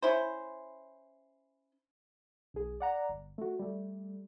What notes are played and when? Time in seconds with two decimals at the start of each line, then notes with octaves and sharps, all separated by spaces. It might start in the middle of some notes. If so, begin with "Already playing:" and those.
0.02 C#4 E4 C5
2.54 B1 G#4
2.80 D5 F#5 A#5
3.09 G1
3.38 A3 F#4
3.59 G3 A3